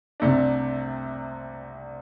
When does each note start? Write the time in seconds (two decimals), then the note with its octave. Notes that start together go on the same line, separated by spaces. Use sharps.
0.20 C2 C3 A3 D4